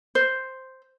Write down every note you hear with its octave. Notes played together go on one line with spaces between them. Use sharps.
C5